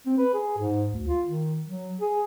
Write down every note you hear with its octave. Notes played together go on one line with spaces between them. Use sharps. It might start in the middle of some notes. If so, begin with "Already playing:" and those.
C4
B4
G#4
G#2
D2
F4
D#3
F#3
G#4